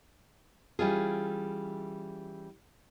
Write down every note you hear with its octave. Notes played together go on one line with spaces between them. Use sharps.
E3 G3 C#4 F4 G#4